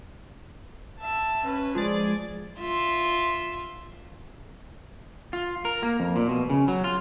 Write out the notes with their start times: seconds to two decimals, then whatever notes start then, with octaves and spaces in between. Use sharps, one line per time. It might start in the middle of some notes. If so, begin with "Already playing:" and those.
1.00 E5 A5
1.44 C#4 B4
1.75 F3 G#3 G#4 D5 A6
2.59 F4 E5
5.33 F4
5.65 A#4
5.83 A#3
6.00 F2
6.16 A#2
6.29 B2
6.50 C#3
6.68 F#3
6.84 F4